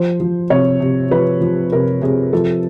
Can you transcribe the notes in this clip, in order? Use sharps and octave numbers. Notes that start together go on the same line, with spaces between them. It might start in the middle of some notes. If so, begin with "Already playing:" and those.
Already playing: F3 C5
F3
C3 C#5
C3
F3 B4
F3
C3 A#4
C3 G#4
F3 A4